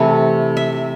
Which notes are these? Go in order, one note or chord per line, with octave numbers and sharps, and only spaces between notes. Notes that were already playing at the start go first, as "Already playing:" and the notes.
Already playing: C3 E3 A3 E4 A4
E5